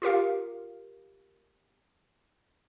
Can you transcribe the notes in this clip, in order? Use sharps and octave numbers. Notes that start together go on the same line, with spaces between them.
F4 G4 A#4 F5